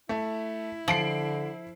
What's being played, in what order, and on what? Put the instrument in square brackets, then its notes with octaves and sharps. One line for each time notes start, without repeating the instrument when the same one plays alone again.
[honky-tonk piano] A3 [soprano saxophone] E4
[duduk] D3 [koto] F3 [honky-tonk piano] C7 D7 F#7